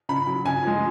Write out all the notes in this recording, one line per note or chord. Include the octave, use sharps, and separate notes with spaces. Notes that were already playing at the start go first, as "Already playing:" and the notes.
C#3 B5
F#3
C#3 G#5
F3 G#3